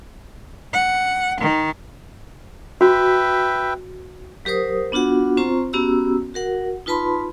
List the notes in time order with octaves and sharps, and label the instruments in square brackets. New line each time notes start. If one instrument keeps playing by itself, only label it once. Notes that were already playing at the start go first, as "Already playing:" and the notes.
[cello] F#5
D#3
[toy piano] F#4 [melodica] B4 E5 G5
[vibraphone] F#3 G4 A#4 C5 D#6
B3 D4 F4 F#4 F#5
C4 F4 C5 A#5 C#6
B3 C#4 F#4 G4 A#5 E6
F#4 A#4 F#5
D#4 F4 B4 A5 B5 C6